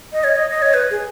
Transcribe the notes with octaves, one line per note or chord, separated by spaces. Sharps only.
D#5
C#5
D#5
D#5
C#5
B4
G#4